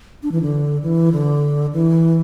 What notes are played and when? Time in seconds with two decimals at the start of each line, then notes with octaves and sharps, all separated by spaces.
0.23 D4
0.32 E3
0.42 D3
0.83 E3
1.12 D3
1.73 E3